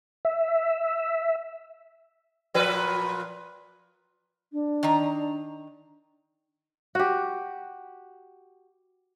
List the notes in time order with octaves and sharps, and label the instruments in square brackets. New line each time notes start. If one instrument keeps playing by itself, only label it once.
[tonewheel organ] E5
[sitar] A#2 F3 B4
[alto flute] D4
[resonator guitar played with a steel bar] D#3 A#5
[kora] F#4 G4